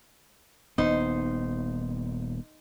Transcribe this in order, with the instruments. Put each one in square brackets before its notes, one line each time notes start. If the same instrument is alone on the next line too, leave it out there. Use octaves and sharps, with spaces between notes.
[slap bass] D#1 B3 [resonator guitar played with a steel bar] D#4 C5